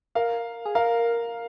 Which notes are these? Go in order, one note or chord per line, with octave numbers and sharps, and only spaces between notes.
A#4 F5
G#4
A#4 F5